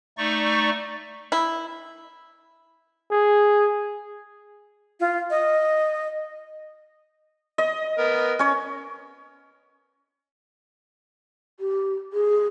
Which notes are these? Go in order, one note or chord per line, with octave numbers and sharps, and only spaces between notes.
A3 D#4 D5 C#6
E4
G#4
F4
D#5
D#5
B3 A#4
C#4 C#5
G4
G#4